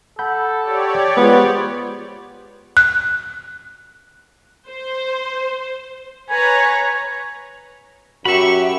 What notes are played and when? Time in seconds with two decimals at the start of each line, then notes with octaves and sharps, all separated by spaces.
0.19 A4 F#5 B5 G6
0.61 G4 C#5 D5
1.17 G#3 B3 F4 G#4 C5
2.77 F#6
4.69 C5
6.30 B4 C#5 G#5 A#5
8.25 F#2 F#4 G4 E5 B5 C#6